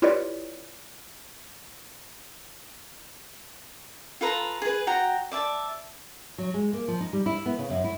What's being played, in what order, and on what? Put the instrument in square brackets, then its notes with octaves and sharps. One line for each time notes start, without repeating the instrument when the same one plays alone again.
[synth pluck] E4 F4 G4 B4 C#5 D5
[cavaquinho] F4 A4 B4 A#5
G#4 B4
F#4 G5 A#5
D5 E5 A5
[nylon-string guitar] F#3
G#3
A#3
F3
D#4
G3
E4
B3
C#3
F#2
E4